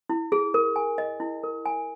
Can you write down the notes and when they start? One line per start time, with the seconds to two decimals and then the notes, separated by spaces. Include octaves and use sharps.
0.10 E4
0.32 G#4
0.54 A#4
0.76 G#5
0.98 D#5
1.20 E4
1.43 A#4
1.66 G#5